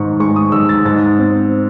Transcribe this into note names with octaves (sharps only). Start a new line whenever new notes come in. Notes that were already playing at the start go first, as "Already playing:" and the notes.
Already playing: G#2 D#3 C#6
G#3 C#6
D#6
G#2 E6
A6
G#2 A6
C4